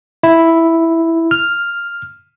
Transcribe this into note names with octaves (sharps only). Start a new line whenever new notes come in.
E4
F6